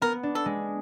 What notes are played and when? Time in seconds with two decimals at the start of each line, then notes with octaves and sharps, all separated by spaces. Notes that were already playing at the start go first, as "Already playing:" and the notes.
0.01 B3 A#4
0.23 D4
0.35 A4
0.46 G#3